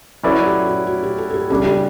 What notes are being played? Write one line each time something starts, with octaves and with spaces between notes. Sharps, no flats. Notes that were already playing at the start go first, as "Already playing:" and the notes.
F#3 C#4 E4 A4 B4 D5
G4
F#4
F#4
G4
A4
A4
G4
C#3 G3 D4 A4
G4